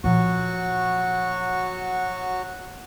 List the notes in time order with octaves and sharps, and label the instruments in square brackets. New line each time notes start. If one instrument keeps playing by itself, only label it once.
[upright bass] A#2 F3 [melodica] F#3 F#4 C#6